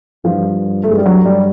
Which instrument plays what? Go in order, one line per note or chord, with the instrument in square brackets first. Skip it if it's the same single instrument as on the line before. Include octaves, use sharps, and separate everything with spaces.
[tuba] G2 [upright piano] F3
[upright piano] A3
G#3
G3
[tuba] G2 [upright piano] F#3
[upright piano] G3